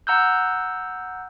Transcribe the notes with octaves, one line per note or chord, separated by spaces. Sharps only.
F#5 A#5 E6 F#6 G6